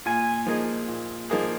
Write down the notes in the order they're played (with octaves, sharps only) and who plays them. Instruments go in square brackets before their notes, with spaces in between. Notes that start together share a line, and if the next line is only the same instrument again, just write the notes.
[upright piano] A#2 [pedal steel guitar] G#5
[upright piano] F3 A#3 D#4 G#4
A#2
F3 A#3 D#4 G#4